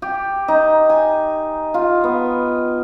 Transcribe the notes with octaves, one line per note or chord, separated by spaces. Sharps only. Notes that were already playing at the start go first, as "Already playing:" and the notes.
G4
D#4
G#5
F4
B3